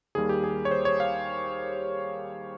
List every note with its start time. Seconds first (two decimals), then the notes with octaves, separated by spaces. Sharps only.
0.15 D#2 D#3 G3 A#3 G#4
0.29 G4
0.44 G#4
0.65 C#5
0.71 C5
0.85 C#5
1.00 F5